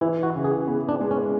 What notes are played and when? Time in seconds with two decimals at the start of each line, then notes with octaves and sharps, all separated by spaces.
0.01 E3 E4
0.23 F#4
0.35 C#3
0.44 G#4
0.67 B3
0.89 D4
1.01 G#3
1.11 C#4